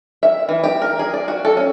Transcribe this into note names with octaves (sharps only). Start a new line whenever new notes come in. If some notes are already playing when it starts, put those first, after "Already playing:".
E5
E3
G4
A#4
G#4
D5
F#4
A4
C#4